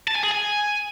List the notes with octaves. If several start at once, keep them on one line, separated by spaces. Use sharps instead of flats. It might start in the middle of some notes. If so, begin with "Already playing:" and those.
A5
G#5
G#4
G#5